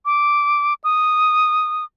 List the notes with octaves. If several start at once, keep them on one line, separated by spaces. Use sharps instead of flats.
D6
D#6